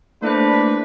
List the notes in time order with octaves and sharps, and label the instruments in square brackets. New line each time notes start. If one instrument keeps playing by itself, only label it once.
[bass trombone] A3 [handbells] A#3 E4 C5 [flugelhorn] D4 [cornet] B4